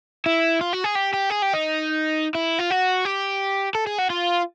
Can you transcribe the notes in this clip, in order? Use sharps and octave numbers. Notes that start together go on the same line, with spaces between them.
E4
F4
F#4
G#4
G4
G4
G#4
G4
D#4
E4
F4
F#4
G4
A4
G#4
F#4
F4